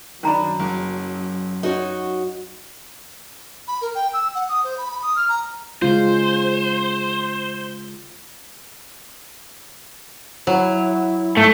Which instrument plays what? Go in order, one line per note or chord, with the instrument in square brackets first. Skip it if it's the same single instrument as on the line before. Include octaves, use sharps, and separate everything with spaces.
[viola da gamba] F#2 [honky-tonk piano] D#3 D4 [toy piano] A#4 A#5 B5
[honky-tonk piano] F#1
[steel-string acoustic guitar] D#4 F#4 C#5
[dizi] B5
A#4
G5
E6
F#5
D#6
C5
B5
B5
D#6
F6
A#5
[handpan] C#3 G#3 F4 [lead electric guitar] C5
[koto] F#3 [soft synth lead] E4
[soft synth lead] G#2 [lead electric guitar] A3